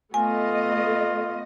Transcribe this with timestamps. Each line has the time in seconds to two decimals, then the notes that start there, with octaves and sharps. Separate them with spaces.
0.14 A3 B3 F4 D#5 G#5